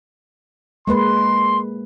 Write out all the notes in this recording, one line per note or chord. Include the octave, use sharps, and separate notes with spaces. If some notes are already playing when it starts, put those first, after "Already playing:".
G#3 A#3 B4 C6